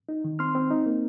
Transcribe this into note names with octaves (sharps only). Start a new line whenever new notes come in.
D#4
D#3
C4 C6 F6
C4
D#4
A#3